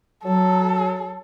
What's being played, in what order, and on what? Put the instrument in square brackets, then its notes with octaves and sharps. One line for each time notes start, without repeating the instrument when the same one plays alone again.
[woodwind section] F#3 [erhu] A4